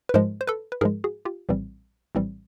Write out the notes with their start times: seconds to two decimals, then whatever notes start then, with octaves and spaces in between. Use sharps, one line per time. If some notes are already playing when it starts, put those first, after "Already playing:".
0.09 B4
0.14 G#2 F3 G#3 A#4 C5
0.41 C5
0.47 A4 B4
0.72 B4
0.81 G#2 F3 G#3 G#4 A#4
1.04 F#4 G#4
1.25 F4 G4
1.49 A#1 A2 E3 G3 C4
2.15 A#1 A2 E3 G3 C4